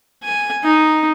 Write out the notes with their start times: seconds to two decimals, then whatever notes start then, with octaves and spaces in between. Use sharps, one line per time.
0.24 G#5
0.64 D#4